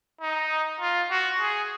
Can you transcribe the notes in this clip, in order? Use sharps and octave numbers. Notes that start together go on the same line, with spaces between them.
D#4
F4
F#4
G#4